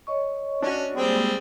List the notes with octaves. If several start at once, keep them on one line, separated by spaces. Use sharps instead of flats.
C#5 D#5 C#6
C#4 D4 F#4
G3 G#3 A#3 C4 G#4 C5